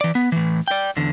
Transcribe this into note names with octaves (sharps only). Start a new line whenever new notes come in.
E3 D5
B3
A2 E3
D5 G5
E2 D3